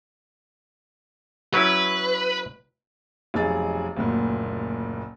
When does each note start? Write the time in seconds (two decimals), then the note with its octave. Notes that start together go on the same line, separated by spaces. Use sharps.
1.54 F#3 C#4 E4 B4
3.34 F1 B1 D#4 G#4 A6
3.96 F#1 D2 A#2